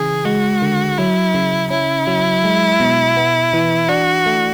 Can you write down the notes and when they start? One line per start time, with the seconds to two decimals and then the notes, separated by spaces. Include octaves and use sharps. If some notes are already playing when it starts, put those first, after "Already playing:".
Already playing: C#3 E3 G#4
0.25 G#3 F#4
0.62 D3
0.98 F#3 E4
1.35 C#3
1.70 C#4 E4
2.07 F#3
2.44 G#3
2.80 B2
3.17 B3
3.53 E3
3.89 D4 F#4
4.26 A3